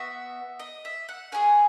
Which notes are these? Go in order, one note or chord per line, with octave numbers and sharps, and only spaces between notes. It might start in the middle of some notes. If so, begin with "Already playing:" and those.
Already playing: B3 F#4 E5
D#5
E5
F#5
C#4 E4 G#4 G#5